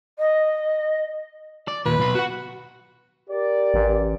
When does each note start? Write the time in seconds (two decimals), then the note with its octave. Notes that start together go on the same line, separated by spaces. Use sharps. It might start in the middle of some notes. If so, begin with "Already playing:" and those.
0.19 D#5
1.68 D5
1.86 D#2 A#2 B4
1.99 B1 B5
2.15 F#4 F#5
3.29 G4 A#4 D5
3.74 A1